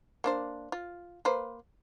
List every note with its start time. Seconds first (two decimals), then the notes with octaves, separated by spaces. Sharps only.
0.24 A#3 D4 C5
0.72 F4
1.25 A#3 B4 C5